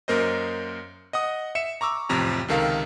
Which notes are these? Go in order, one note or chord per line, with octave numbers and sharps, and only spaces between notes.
F#2 A#3 A#4 C5 D#5
D#5 F#5 D#6
E5 C#7 E7
A#5 C#6 D6 E6
A1 F2 C3 F3 A#5
C#2 C3 D#3 A4 A#4 F5